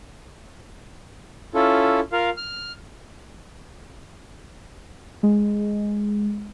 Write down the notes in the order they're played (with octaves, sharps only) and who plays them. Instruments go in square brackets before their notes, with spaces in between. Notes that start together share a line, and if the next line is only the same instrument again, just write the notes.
[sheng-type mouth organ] C#4 E4 F4 A4
F4 A#4 F5
F6
[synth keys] G#3